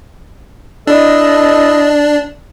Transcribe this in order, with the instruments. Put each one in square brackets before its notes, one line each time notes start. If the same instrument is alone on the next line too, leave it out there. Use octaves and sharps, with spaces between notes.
[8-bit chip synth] D4 [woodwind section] E4 A4 D#5